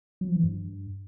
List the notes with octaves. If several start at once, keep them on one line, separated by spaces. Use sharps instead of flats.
F#3
F3
E3
G2